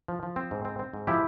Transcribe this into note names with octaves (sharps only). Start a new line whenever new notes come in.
F3
F3
C4
G#2
C4
C4
G#2
F3 E4 G4